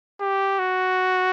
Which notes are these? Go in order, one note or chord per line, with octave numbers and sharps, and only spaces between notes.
G4
F#4